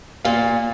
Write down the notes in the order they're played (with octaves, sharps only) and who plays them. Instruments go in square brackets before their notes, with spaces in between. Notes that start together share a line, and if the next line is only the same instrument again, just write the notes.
[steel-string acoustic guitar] A#2 [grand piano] F5